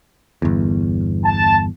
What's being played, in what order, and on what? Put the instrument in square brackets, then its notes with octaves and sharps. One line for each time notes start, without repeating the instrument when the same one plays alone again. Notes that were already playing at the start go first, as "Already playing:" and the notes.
[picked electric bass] G1 E2
[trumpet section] A5